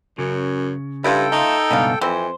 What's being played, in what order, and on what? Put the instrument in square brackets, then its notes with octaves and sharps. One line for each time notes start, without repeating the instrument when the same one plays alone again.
[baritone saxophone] F#2 [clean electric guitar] C#3
[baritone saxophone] G2 [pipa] E4 F4 [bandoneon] A4 G5
[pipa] A3 F4 [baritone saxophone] D#4
[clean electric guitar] C#2 G2 B2 [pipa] E3 D4 F5
[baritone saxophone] F2 [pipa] E3 C4 [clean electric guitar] C5